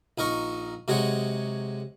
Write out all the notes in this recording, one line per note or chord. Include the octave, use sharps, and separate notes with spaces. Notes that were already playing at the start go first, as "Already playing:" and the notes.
A#1 D#4 A#4 C#6
C3 F#3 G#3 G#4 F#5